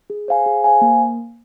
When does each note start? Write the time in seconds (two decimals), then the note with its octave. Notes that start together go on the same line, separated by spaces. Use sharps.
0.10 G#4
0.28 C5 F5 G#5
0.46 G#4
0.64 C5 F5 G#5
0.81 A#3